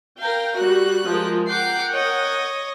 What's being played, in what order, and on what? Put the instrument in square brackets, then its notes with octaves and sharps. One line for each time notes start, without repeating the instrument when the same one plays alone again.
[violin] A#4 F5 [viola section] G5
[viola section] G3 F#4 [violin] F#6
[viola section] F3 G#3 A#4
[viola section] A#4 F#5 G5 [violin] D6 C7
[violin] C#5 D#5